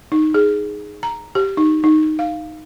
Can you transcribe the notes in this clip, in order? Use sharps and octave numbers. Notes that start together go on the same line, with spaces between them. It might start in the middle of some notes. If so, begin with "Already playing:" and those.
D#4
G#4
A#5
G4
D#4
D#4
F5